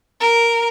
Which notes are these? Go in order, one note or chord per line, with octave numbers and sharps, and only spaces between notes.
A#4